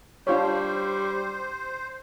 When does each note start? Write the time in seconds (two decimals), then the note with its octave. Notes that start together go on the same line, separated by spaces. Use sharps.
0.27 G3 D4 F4 C5 C#5